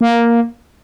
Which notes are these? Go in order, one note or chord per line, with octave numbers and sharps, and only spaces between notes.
A#3